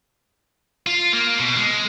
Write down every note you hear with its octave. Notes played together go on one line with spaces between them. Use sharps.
F4
A#3
B2
G#3